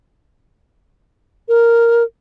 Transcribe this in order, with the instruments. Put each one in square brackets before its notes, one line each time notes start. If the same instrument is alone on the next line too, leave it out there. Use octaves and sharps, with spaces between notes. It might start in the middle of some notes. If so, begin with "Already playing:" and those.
[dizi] A#4